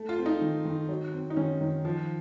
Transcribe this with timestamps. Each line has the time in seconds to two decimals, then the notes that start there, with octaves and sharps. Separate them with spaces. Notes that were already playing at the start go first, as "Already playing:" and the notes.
Already playing: A3
0.09 F4
0.18 C4
0.26 D#4
0.41 D#3
0.65 D#3
0.89 F#3
1.13 C4
1.30 D#4
1.36 D#3 C#4
1.61 D#3
1.85 F3